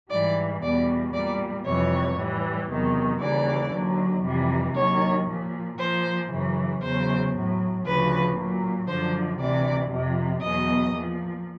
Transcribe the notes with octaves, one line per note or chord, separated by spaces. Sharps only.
G#2 E3 G3 D5
E2 B2 G3 D5
A#2 G3 D5
F2 C3 E3 G3 C#5
A2 E3 G3
E2 C3 D#3 F#3
D#2 C#3 E3 G3 D5
D#2 D3 F#3
F2 C3 E3 G3
D#2 D#3 F#3 C#5
A#2 F3
A#2 F3 C5
F#2 C#3 E3
E2 C#3 F#3 C5
A2 F#3
D2 C#3 F3 B4
A#2 F#3
F#2 D3 F3 C5
D2 C3 E3 D5
F2 C3 F3
E2 B2 F#3 D#5
A#2 F3